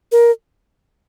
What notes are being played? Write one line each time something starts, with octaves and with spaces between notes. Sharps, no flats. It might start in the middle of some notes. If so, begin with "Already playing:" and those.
A#4